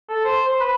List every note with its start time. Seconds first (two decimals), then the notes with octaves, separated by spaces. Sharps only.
0.09 A4
0.25 C5
0.48 C5
0.60 B4